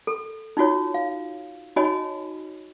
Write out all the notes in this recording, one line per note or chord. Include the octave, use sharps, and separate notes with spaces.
A4
D#4 F4 F#4 C#5
F5
D#4 F#4 C#5 D#5 G#5 B5